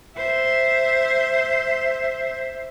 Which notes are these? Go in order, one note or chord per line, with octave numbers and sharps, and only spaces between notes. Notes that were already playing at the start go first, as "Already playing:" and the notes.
C5 E5